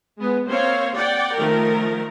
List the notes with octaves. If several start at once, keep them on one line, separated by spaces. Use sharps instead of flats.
G#3 B3
A#3 C4 C5 C#5 F5
D5 F#5 G5
D#3 F3 A3 A#4